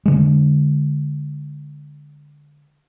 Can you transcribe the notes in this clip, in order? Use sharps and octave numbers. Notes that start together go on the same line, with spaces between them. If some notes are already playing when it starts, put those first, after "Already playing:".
D3 G#3